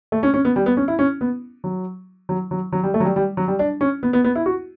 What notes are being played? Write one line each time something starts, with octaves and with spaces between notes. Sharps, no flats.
A3
C#4
C#4
B3
G3
B3
C#4
E4
C#4
B3
F#3
F#3
F#3
F#3
G3
A3
F#3
G3
G3
F#3
G3
D4
C#4
B3
B3
B3
E4
F#4